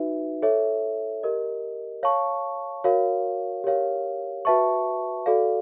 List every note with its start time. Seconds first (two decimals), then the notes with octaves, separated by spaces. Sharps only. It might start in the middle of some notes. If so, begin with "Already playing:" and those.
Already playing: D#4 F#4 B4 E5
0.42 A4 C#5 E5
1.23 G4 A#4 D#5
2.03 C#5 F5 A5 C#6
2.84 F#4 A#4 C#5 F5
3.64 G4 A#4 C#5 F5
4.45 F#4 B4 E5 A5 C#6
5.26 F#4 A4 D5 F5